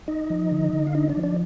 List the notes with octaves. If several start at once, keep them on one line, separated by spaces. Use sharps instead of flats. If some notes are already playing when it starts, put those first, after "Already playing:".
D#4 D#5
F3
D3
D3
F5
D4 D#4 D#5
D4 D5
F3
D4 D5